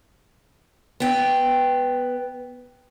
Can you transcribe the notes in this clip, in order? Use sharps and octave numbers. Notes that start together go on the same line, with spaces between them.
B3 G5